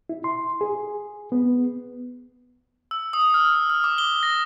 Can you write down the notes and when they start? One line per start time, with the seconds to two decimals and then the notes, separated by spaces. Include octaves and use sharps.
0.09 E4
0.24 C6
0.61 G#4
1.32 B3
2.91 E6
3.13 D#6
3.34 F6
3.70 F6
3.84 D6
3.98 G7
4.23 A#6